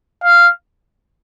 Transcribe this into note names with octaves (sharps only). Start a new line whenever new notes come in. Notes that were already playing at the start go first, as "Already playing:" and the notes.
F5